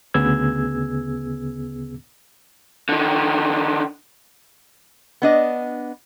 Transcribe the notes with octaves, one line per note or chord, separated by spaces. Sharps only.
D2 C#3 B3 G#4 E6 G#6
D3 D#3
B3 D4 D#5